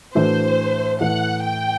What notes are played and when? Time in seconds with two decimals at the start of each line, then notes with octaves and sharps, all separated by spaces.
0.14 A2 E3 A3 D4 F#4 C5
1.01 A2 E3 A3 F#5
1.43 G5